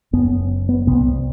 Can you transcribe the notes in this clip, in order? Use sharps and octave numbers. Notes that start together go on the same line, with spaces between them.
F#1 F#2 B3
B3
C2 C3 B3